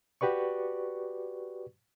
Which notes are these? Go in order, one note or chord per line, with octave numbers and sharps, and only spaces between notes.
F#4 G4 B4 D5 C#6